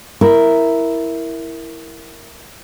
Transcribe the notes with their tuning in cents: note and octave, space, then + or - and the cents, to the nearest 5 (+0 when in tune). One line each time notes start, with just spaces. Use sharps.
E4 +0 A#4 +0